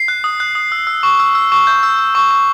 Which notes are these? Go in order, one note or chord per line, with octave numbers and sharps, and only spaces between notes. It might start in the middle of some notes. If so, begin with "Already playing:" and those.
Already playing: C7
F#6
D#6
F#6
D#6
E6
E6
C#6
E6
E6
C#6
G6
E6
E6
C#6
C#6